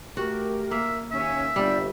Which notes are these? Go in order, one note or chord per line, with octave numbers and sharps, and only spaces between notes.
A3 F#4 G4 A#4
A#3 E5
D#2 C#4 E5
G1 G3 G4 D5